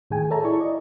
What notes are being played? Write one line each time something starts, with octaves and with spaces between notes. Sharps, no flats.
A2 D#3 G#4 G5 G#5
G#4 A4 C#5 E5 A5 A#5
E4 D5 C#6
E4 D5 D#5